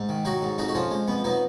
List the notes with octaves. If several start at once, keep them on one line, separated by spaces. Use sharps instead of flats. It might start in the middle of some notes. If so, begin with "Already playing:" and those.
Already playing: G#2
D#3
F#3 D#4 F#4
G#2
F2 D#4 F#4
F#4
F3 C#4 F4
G#3
F2 B3
F#3 B3 D#4